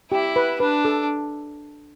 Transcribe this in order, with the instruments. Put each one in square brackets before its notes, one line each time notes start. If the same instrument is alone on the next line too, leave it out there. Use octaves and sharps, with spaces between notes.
[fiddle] E4 [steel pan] G4
[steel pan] B4
[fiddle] D4 [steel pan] B4
[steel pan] A4